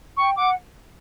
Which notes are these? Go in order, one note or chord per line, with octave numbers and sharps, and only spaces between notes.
G5 C#6
F#5 D6